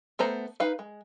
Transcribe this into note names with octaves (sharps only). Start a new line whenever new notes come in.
A3 B3 C5 A#5
D#4 B4 F5
G#3